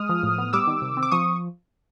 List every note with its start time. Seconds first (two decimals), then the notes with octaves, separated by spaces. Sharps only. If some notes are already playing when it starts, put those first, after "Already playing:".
Already playing: G#3 D#6 F6
0.09 F3
0.23 A2
0.38 B3
0.53 G3 D6 E6
0.68 D#3
0.82 C3
0.97 C4
1.03 D6
1.11 F3 C#6 D#6